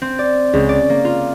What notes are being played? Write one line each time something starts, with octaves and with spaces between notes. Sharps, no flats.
C4
D5
C#2
D5
A#3
F4